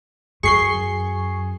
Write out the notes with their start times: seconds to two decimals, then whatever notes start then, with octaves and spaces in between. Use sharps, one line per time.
0.43 F#2 G#4 C#6 C7 G7